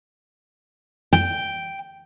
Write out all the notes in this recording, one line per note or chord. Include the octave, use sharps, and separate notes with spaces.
G5